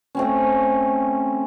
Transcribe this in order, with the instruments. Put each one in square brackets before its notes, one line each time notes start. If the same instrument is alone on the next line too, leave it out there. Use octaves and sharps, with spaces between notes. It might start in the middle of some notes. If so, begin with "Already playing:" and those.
[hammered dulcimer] A3 C4 C#4